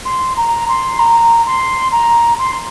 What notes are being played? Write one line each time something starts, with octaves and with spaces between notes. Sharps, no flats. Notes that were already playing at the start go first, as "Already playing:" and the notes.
C6
A#5
C6
A#5
C6
A#5
C6